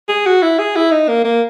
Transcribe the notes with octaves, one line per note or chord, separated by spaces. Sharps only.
G#4
F#4
E4
G#4
E4
D#4
A#3
A#3